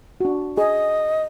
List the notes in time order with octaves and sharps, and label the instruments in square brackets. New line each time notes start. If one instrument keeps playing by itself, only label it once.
[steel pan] D4 F#4
[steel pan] G#4 [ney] D#5